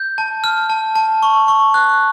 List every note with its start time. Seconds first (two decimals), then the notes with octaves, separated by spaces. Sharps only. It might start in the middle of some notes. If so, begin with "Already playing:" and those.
Already playing: G6
0.18 A5
0.44 F6
0.70 A5
0.95 A5
1.23 C#6
1.48 C#6
1.74 F#6